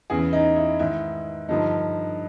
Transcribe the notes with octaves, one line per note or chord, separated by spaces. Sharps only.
E2 C#3 E3 G#4
D#4
E4
G#2 D#3 E4
G2 D3 F3 D#4